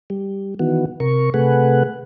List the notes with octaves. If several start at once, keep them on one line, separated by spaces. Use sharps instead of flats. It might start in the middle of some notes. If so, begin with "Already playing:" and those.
G3
D#3 E3 B3 F#4
C3 A#4 C#6
C3 A3 G#4 B4 F#5